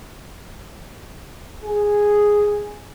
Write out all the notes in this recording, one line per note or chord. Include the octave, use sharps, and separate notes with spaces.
G#4